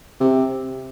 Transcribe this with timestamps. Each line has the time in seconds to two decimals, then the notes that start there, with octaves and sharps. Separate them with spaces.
0.20 C3